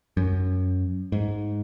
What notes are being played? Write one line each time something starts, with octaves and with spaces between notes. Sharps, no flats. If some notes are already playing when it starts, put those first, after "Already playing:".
F#2
G#2